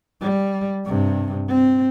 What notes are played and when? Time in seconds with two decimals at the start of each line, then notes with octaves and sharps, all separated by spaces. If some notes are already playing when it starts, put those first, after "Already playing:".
0.21 G3
0.85 G2 C3
1.48 C4